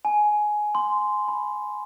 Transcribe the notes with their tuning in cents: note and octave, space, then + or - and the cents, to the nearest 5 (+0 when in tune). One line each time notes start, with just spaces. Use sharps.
G#5 +15
C6 -10
B5 -15